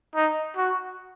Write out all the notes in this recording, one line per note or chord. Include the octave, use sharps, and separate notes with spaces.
D#4
F#4